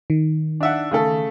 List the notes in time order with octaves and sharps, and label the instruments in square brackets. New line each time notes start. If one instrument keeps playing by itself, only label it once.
[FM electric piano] D#3
[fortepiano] D4 E5 F#5
C#3 A3 A4